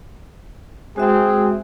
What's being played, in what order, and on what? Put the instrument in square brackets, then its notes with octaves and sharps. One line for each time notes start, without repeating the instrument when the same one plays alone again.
[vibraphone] G#3 F#4 E5 [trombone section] C4 G#4